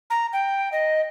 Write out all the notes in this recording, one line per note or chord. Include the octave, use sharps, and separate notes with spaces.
A#5
G5
D#5